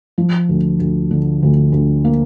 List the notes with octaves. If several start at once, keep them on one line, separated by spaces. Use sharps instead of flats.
F3
D2
D2
D3
D2
D2
A#3